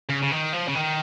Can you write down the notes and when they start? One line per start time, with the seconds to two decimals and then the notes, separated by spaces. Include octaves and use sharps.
0.09 C#3
0.22 C#3
0.31 D#3
0.53 F3
0.68 C#3
0.75 D#3